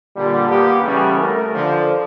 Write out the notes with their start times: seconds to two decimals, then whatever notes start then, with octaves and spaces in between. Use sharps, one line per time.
0.16 A#2 D3 G3
0.48 A#3 B3 G4
0.83 C#3 E3 G3 A3 B3 C#4
1.18 A3 A#4
1.54 D3 F3